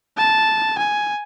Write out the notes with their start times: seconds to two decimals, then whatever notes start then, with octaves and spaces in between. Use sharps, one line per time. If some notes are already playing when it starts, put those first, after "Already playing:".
0.18 A5
0.78 G#5